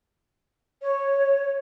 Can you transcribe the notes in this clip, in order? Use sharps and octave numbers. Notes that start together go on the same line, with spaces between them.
C#5